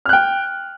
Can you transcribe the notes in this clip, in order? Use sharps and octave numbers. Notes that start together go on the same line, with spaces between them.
G5 F6 F#6